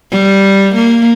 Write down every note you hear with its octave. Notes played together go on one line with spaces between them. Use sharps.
G3
A#3